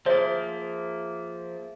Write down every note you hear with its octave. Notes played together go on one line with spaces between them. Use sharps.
F3 A#3 G#4 C5 E5